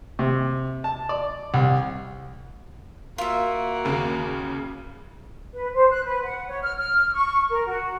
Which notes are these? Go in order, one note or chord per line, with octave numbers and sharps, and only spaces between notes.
C3
A5
D5
C2
A#3 F4 F#4 E5
D#2 C#3
B4
C5
F#6
B4
F#5
C#5
F6
F6
C#6
A#4
F#4